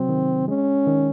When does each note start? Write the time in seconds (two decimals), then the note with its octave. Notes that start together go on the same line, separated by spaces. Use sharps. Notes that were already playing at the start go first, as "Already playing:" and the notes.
Already playing: C3 F#3 C4
0.09 D#3
0.48 G#3 C#4
0.87 D#3